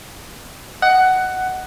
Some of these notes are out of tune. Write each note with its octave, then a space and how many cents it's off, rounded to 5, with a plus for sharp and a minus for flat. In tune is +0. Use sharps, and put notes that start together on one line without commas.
D#5 +0 F#5 +10